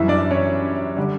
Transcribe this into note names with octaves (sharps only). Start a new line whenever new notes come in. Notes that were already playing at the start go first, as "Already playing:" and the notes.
Already playing: F#2 E3 G3 E4 E5
D4 D5
C#4 C#5
D3 G3